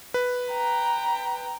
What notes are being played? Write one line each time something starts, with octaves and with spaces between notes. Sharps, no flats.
B4
G5 A#5